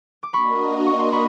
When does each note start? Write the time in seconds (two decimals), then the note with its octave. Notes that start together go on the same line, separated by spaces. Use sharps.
0.23 D6
0.33 A#3 D4 F#4 A#4 D#5 B5 C#6
0.86 C#6
0.99 C6
1.12 B5 C#6